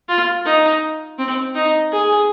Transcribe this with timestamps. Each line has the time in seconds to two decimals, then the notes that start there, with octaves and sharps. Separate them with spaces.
0.09 F4
0.45 D#4
1.18 C4
1.55 D#4
1.92 G#4